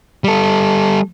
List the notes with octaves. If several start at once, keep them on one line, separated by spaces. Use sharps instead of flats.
G3 A4